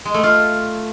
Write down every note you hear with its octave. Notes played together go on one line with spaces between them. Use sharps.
G#3
A3
F4